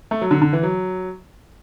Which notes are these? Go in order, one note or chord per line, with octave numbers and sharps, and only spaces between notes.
A3
F#3
D3
D3
E3
F#3